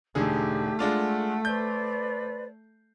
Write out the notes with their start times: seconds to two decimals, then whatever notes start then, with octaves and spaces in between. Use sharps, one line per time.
0.15 E1 D3 A3 D4 D#4 G4 G#4
0.79 G#3 D4 F4 F#5
1.45 B4 C5 D5 G6